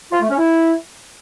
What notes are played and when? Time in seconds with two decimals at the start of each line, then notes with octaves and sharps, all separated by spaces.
0.12 F4
0.21 A3
0.29 C#4
0.38 E4